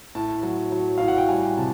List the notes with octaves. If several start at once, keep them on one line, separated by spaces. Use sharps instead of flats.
A2 A5
F#3
F#3
A2 F5
F#5
G5
G3 G#5
C3 A5